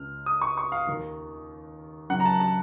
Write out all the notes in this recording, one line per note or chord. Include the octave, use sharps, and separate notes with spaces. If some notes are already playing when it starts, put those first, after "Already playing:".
Already playing: C#2 C#3 F6
D#6
C#6
C#6
F5
D#2 D#3
F#2 C#3 F#5
A#5
A5
A5